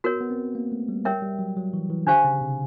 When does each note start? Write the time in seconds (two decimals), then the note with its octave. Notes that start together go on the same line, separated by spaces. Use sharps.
0.04 B3 F#4 A#4 C#5
0.21 B3
0.30 C4
0.55 A#3
0.72 A3
0.89 G3
1.05 G3 A#4 C#5 E5 G5
1.22 G3
1.39 F#3
1.57 F#3
1.73 E3
1.90 E3
2.07 D3 D4 G4 C5 F5 G#5
2.25 C#3
2.41 C3